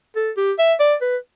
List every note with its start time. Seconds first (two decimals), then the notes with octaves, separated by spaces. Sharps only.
0.16 A4
0.37 G4
0.59 E5
0.80 D5
1.01 B4